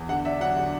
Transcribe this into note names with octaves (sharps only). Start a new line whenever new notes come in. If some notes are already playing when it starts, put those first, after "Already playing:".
Already playing: E2
D3 F#5
D4 E5
F#3 F#5
D3